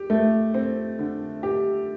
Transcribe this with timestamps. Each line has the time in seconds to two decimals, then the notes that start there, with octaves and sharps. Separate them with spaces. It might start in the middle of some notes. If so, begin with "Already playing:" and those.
Already playing: G4
0.10 A3
0.54 C4
0.99 D3
1.43 G4